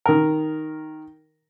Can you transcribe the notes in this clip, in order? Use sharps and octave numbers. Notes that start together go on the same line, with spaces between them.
D#3 A#4